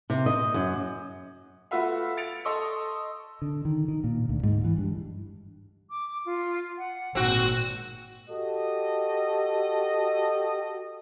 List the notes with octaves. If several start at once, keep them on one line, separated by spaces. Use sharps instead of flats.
C3
D#5
F#2
A3 F4 F#4 B4 E5 F5
A6 C#7 D7 F7
A4 D#5 C6 C#6 D#6 E6
D3
D#3
D#3
A#2
D2
G#2
E3
G2
D6
F4
F#5
G#1 A#2 C4 F#4
F#4 G4 A4 D#5